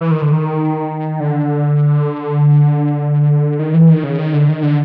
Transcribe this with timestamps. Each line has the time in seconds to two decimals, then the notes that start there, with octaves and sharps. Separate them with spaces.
0.01 E3
0.11 D#3
0.22 D3
0.32 D#3
1.20 D3
3.59 D#3
3.74 E3
3.89 D#3
4.04 C#3
4.18 D#3
4.34 D3
4.49 D#3
4.63 D3